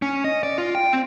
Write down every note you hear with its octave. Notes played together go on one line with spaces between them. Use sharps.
C#4
D#5
D5
F4
G5
C4